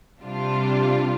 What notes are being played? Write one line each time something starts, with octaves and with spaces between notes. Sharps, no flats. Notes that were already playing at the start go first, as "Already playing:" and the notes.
C3 G3 D4 F4